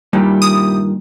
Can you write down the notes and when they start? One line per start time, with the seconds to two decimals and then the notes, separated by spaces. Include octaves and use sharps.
0.13 G2 A#2 D#3 G3 E4 G4
0.42 D#6